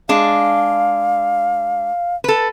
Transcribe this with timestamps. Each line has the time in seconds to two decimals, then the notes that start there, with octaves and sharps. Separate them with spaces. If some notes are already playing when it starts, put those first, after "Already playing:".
0.09 G#3 D4 F5
2.24 A4 B4